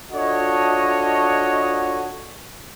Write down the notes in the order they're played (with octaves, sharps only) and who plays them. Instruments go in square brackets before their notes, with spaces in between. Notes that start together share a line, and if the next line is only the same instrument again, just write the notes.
[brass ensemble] D4 F4 F#4 A4 C#5 D#5